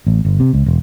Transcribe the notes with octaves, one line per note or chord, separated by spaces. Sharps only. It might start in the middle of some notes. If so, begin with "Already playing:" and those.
A1
G1
C3
C#2
E1